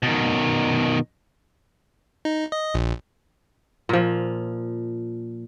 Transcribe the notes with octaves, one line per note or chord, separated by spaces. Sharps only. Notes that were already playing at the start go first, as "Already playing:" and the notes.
B2 D#3
D#4
D#5
A#1
A#2 F3